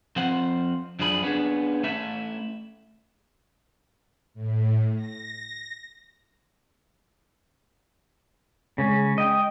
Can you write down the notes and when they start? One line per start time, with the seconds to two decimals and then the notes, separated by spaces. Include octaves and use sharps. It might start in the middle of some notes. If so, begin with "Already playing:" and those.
0.16 F3 C4 C5 F#5
0.99 F#2 F3 D4 G#4 B5
1.23 B3 C#4 D4 G#4
1.84 A3 C#4 E4 E5
4.34 A2
4.96 A#6
8.78 C#3 G#3 C#4
9.18 D#5 G5